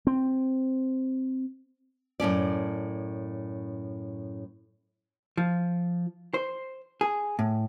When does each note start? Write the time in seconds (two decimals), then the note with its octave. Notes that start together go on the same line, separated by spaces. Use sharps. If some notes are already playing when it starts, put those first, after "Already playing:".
0.07 C4
2.20 F#2 A2 C#4 D5
5.37 F3
6.34 C5
7.01 G#4
7.39 A2